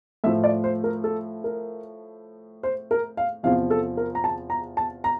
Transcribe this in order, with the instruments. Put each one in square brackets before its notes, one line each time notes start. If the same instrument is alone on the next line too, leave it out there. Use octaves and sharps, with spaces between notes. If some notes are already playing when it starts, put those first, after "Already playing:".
[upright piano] A2 F3 E5
D5
C5
A#4
A4
A#4
C5
A#4
F5
E2 C3 F3 F5
A4
A#4
A#5
A5
A#5
A5
A#5